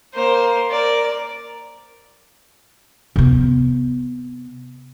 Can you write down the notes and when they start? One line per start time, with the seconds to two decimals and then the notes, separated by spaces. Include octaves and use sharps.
0.14 A#3 C5
0.69 A#4 D5
3.16 C3 B3